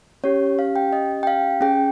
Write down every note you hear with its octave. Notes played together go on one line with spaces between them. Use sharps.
C#4 G4 C#5
F5
G5
D#5
G5
F5
C#4 G#4 G5